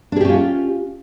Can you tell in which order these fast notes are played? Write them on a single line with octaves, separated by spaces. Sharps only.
D4 G#4 G4 C#4 F4